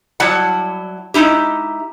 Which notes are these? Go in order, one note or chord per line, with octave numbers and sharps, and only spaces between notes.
F#3 G3 E4 F#5 A5
G#3 D#4 E4 G4